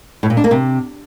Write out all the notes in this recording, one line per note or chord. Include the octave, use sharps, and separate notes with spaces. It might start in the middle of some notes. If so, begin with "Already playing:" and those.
A2
A#2
D4
A#3
C3